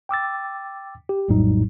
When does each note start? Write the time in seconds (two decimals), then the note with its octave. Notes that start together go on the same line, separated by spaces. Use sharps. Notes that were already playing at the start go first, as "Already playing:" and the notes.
0.09 G5 D6 E6 A6
1.09 G4
1.28 A#1 F2 A2 F#3 G3 D#4